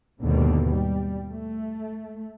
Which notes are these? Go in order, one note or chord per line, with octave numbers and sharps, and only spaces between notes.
D#2 G#2 B2 D3
G3
A3